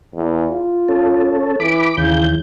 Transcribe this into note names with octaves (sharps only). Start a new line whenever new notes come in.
E2
F4
C#4 A4
E3 B5 D6
D#2 C#3 E3 G6